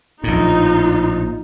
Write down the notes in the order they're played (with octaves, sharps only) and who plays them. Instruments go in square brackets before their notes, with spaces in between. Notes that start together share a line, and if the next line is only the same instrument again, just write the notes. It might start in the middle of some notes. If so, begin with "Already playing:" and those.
[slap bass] A#1 A2 [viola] D#4 F4